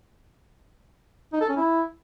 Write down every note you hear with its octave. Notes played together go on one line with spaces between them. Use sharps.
D#4
A4
C#4
E4